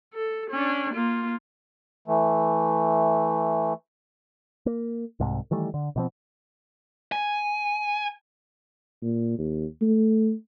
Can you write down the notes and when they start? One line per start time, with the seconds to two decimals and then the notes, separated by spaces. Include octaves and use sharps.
0.14 A4
0.50 C#4 D4
0.94 A#3 F4
2.08 E3 A3
4.66 A#3
5.20 C2 G#2 C3
5.51 D#3 E3 G3 A3
5.74 D3
5.96 B2 F3 C4
7.12 G#5
9.02 A#2
9.39 D#2
9.82 A3